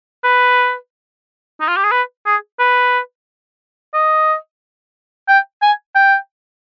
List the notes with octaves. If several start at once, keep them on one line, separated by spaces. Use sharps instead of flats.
B4
D#4
F4
G4
G#4
B4
G#4
B4
D#5
G5
G#5
G5